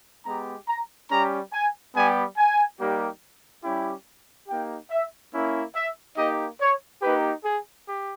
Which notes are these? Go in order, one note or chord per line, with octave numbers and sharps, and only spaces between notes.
G#3 B3 G4 A#5
A#5
G3 C#4 G4 A#5
G#5
G3 B3 G4 G#5
G#5
G3 A#3 D#4 G4
G3 C#4 E4 G4
A#3 D#4 G4 G5
E5
A#3 C#4 E4
E5
A#3 D#4 G4 D#5
C#5
A#3 D#4 G4 B4
G#4
G4